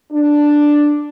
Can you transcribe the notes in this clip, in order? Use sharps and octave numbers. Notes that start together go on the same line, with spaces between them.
D4